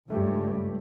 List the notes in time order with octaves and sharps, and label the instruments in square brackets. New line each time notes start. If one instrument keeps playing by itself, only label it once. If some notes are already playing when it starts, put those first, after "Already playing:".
[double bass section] C#2 G2 [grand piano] A3 G4